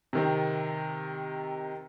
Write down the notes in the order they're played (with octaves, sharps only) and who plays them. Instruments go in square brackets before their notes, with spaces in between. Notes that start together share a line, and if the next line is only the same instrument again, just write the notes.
[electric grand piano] C3 D#3 C4